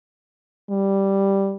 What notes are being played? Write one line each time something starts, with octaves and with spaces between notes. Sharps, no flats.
G3